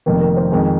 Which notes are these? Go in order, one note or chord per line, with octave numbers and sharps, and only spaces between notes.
F1 F2 D#3 A#3
A#4
C5
F2 D#3 G#3